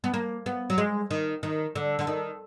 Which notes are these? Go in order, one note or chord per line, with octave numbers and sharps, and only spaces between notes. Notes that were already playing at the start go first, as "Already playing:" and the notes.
B3
A#3
B3
F#3
G#3
D#3
D#3
D3
D3
D#3